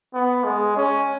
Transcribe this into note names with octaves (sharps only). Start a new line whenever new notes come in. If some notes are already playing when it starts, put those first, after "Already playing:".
B3
G#3
C#4